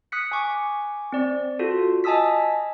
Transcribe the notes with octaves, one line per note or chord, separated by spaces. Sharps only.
D#6 F#6 B6 C#7
G#5 C#6 D6
C4 D5
F4 F#4 A4
D#5 G#5 A5 D#6 E6 B6